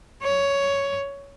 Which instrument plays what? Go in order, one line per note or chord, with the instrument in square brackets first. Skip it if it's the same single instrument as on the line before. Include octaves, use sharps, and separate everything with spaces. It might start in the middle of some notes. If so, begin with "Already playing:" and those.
[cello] C#5